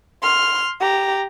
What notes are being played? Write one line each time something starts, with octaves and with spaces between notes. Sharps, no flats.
C6 F6
G4 A#5